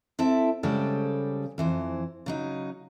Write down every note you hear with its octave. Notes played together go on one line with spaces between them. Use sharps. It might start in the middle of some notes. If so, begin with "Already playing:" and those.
C4 E4 A4 E5
C#3 G3 G#3 G4 A4 C5
F2 E3 C5
C#3 F#3 D#4